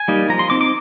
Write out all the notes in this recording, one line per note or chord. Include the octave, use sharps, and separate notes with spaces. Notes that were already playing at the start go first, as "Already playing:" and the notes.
Already playing: G#5
G3 A#3 D#4
F3 A#5
C6
C4 D#4 D6
D6